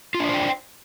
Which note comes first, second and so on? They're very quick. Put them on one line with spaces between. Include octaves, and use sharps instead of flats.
F4 D4 D5 C5 G5